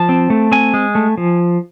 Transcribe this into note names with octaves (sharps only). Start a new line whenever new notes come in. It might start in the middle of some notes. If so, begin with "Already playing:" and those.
Already playing: F3 A5
C4
A3
C4 G#5
G#3
A3
F3